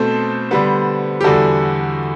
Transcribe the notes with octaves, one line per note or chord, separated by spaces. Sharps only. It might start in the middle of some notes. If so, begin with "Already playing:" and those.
Already playing: B2 A3 C4 A4 C5
D3 G3 B3
G4
E2 D3 G3 F#4 A4